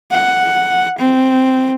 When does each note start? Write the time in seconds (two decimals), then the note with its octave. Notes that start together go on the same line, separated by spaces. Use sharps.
0.12 F#5
0.98 C4